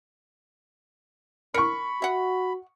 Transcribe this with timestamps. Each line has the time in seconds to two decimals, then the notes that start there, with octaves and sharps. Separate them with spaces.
1.54 A#4 B5 C#6 C#7
2.02 F#4 E5 F#5